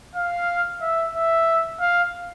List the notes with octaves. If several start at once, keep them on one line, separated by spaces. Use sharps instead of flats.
F5
E5
E5
F5